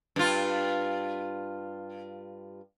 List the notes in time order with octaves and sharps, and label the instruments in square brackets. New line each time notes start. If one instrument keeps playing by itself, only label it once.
[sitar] G2 F4